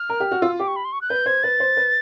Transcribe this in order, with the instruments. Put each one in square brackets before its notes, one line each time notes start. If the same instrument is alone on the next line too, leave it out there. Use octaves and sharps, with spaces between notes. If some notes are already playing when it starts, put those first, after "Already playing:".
Already playing: [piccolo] F6
[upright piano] A#4
G4
F#4
[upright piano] F4 [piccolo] E6
[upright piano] G4 [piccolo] D6
[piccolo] C#6
B5
C6
C#6
F#6
[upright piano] B4 [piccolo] G6
[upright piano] C5 [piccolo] G#6
[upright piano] B4 [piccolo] A6
[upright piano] C5
B4